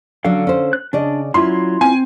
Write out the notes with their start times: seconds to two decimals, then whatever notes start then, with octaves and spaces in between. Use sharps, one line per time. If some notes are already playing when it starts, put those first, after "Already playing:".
0.24 D3 F#3 C#4 D4 A4 F5
0.47 C#4 C5
0.73 F#6
0.93 C#3 D4 D5 D#5
1.34 F#3 C#4 E4 F4 C6
1.81 C4 G#5